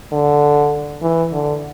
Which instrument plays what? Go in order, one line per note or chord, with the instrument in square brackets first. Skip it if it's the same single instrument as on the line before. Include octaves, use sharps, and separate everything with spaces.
[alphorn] D3
E3
D3